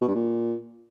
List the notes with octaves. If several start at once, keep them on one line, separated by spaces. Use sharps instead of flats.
B2
G2
A#2